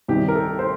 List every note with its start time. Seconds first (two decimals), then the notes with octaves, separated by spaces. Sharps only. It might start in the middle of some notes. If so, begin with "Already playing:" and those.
0.08 C2 C3 D#3 G3 G4
0.28 A#4
0.35 A4
0.59 C5